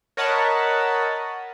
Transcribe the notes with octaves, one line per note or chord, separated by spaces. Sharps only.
A#4 C#5 D#5 F#5 A5 B5